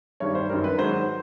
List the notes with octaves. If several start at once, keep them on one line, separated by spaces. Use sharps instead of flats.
G2 D#3 G3 C#5
C5
F#2 D#3 G3 A#4
B4
G#2 D#3 F#3 C5